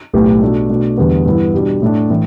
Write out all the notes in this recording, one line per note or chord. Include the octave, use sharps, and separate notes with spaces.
B1 A2 A3 G4 B4
B2 A3 D4
B2 A3 D4
E2 D3 G3 B3
G2 E3 B3 E4
B2 G3 D4
A2 A3 D4
A2 E3